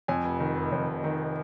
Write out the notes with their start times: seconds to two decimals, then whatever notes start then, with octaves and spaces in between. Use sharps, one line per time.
0.08 F2 G#5
0.24 F1
0.40 D#3
0.56 F1
0.72 F2
0.88 F1
1.04 D#3